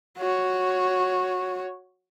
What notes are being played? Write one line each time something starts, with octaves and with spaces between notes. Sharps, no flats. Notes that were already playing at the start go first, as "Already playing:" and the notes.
F#4 C#5